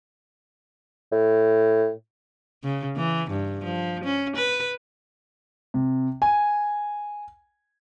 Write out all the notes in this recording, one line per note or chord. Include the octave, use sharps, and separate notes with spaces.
A2
C#3
E3
G2
F3
C#4
B4
C3
G#5